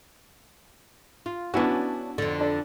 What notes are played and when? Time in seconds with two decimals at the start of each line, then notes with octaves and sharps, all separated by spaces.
1.26 F4
1.54 B3 C#4 D4 E4 F#4
2.18 F2 D3
2.41 D4